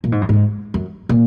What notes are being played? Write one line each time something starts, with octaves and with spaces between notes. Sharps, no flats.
A#2
G#2
F#2
G#2
F#2
A#2